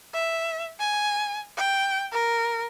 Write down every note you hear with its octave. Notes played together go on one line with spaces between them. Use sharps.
E5
G#5
G5
A#4